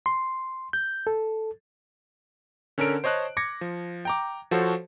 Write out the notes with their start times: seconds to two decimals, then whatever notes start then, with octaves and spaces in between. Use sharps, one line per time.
0.06 C6
0.73 G6
1.07 A4
2.78 D3 C#4 A4 A#4 D7
3.04 C5 C#5 D#5 A5 F#6
3.37 D6 G#6 A#6 C#7
3.61 F3
4.05 G5 A#5 D6
4.51 F3 F#4 A4 C5 C#5